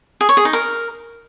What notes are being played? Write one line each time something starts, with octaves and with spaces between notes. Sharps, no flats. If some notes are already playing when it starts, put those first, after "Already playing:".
G#4
C#5
G#4
D#4
A#4